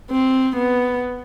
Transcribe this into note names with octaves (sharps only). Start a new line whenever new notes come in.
C4
B3